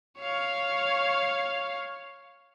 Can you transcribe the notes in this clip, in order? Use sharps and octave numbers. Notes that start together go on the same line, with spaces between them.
C#5 F5